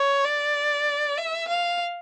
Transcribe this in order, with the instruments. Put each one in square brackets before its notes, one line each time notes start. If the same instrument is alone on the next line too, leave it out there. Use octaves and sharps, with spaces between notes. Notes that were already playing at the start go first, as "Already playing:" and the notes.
Already playing: [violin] C#5
D5
E5
F5